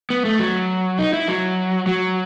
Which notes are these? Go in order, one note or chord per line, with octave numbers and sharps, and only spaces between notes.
B3
A3
F#3
D#4
E4
F#3
F#3